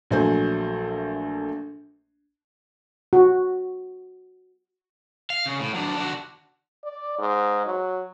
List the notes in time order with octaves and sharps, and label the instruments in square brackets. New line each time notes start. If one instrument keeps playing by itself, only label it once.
[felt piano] A#1 F#3 A3 C5 G#5
[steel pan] F#4
[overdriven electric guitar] F5
C#3
A2
F#3 D4
D4 F#4
[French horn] D5
G#2
F#3